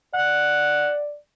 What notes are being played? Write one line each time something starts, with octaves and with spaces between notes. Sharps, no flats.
D5 F#5